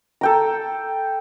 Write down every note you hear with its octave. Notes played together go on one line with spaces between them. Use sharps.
A4 G5 A#5